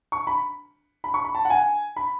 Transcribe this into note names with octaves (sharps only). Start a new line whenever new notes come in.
C#6
B5
B5
C#6
B5
A5
F#5
G#5
B5